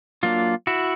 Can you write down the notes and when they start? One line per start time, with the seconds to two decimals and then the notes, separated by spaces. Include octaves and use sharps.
0.23 F#3 A#3 D4 F4
0.67 E4 F#4